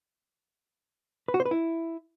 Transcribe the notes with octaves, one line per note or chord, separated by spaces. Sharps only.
B4
F#4
C5
B4
E4